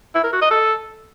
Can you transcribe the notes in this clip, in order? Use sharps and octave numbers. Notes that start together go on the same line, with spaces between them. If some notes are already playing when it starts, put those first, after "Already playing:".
E4
A#4
F#4
D#5
A4